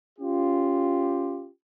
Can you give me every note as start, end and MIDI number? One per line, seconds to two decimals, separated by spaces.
0.19 1.47 61
0.19 1.47 65
0.19 1.47 67